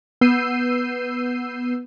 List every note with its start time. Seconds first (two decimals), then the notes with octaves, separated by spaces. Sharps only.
0.21 B3 E6 G6 C7 D#7